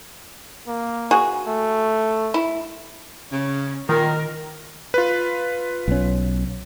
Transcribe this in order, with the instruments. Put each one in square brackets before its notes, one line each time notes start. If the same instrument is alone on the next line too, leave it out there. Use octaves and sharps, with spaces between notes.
[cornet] A#3
[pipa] F#4 G#4
[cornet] A3
[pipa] E4
[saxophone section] C#3 [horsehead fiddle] C#4
[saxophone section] A#2 [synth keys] D#3 [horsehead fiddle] A#4
[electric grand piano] F4 B4
[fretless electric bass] B1 C#4